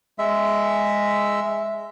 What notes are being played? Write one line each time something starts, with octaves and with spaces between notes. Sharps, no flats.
G#3 E5